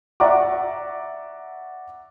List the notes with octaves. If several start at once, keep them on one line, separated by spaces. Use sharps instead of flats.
D5 E5 F#5 A#5 C#6 D6